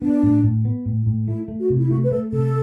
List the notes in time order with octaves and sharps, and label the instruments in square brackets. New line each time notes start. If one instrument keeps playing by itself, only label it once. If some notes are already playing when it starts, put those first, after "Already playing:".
[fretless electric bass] B3 [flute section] D4
[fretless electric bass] A2
A2
B3
A2
A2
[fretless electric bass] A3 [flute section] E4
[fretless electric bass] A3
[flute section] F#4
[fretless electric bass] C3
[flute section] E4
[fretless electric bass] A3 [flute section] F#4
[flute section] B4
[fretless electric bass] A3 [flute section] A4
[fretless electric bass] C3 [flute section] A4